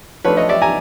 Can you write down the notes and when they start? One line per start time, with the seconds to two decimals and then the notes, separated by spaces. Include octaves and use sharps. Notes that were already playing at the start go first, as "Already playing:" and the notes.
0.25 F3 A3 D4 B4 C#5
0.37 C#5 D#5
0.49 D5 E5
0.62 G#5 A#5